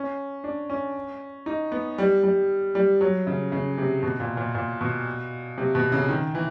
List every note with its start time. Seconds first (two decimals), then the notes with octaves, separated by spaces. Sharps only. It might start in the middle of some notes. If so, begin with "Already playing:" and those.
Already playing: C#4
0.44 D4
0.70 C#4
1.46 D#4
1.72 B3
1.98 G3
2.24 G3
2.75 G3
3.01 F#3
3.27 C#3
3.52 C#3
3.78 C3
4.03 B2
4.20 A#2
4.37 A#2
4.55 A#2
4.81 B2
5.58 C3
5.75 B2
5.92 C#3
6.09 D#3
6.35 E3